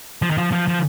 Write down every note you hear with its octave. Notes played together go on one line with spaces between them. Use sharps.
F3
D#3
F3
F3
F3